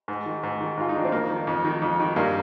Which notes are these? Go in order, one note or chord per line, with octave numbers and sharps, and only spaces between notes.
G#2
D#3
G#2
D#3
G#2 F4
D#4
D#3 D4
C4
F2 A#3
D#3
F2
D#3
F2
D#3
G2 A#3